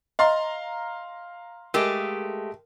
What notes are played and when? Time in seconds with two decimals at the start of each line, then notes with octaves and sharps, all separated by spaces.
0.19 D#5 F5 A#5 C6
1.74 G#3 A3 G4 A#4